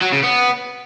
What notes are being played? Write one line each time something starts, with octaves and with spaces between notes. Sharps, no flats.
F#3
C#3
B3